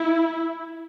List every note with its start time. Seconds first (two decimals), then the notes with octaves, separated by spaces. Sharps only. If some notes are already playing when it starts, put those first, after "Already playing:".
Already playing: E4